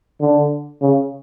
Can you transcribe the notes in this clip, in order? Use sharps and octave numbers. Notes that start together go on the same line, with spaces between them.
D3
C#3